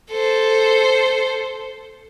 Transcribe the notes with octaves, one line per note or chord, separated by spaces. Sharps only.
A4 C5